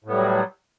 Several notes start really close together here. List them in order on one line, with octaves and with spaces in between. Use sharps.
A2 B3 G3 F#3